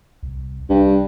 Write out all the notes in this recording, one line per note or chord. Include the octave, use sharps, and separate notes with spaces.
C2
C2 G2